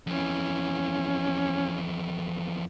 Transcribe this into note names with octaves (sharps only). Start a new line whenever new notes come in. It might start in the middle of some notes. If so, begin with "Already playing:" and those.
F2 E3 C#4